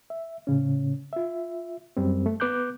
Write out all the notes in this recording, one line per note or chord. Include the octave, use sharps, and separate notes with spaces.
E5
A2 C#3 C#4
F4 E5
F#2 G3 C4
A3
B3 B4 D6 F#6 G6